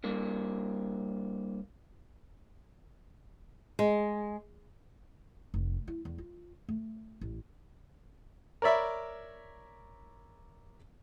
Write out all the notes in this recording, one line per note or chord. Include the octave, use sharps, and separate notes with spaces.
G2 A#3
G#3
F1
E4
E2
F4
A3
A1
A#4 C#5 D5 E5 B5